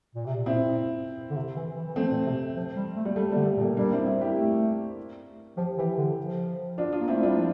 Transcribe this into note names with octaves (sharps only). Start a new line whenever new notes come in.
A#2
C3
A#2
C4 E4
D3
C3
E3
E3
E3
F3 A3 C4
A#2
C3
F3
G3
A3
G3
G3 A3
D3 G3
A3
A#2
G3 A#3
G3 A#3 D4
C4 E4
C4 E4
E4 G4
A3
F3 G4
E3 E4 G4
D3
F3
D4 F4
D4 F4
A#3
A3 C4 E4
G3 D4 F4
F3